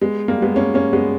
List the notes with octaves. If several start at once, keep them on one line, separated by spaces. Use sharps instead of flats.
G#3 B3
G3 A#3
G#3 B3
A#3 C#4
A#3 C#4
G#3 B3